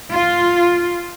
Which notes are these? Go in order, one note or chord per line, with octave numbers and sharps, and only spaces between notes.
F4